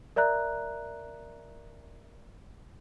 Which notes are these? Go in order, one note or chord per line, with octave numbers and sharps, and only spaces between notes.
A#4 D5 E5 A#5 F#6